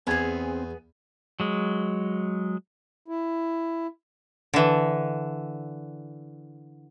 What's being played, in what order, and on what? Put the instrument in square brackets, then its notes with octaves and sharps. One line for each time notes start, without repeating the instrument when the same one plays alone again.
[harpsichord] E2 [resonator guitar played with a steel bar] B3 G#4 [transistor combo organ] C4 [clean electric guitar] G#5
[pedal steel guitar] F#3 G#3
[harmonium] E4
[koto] D3 E3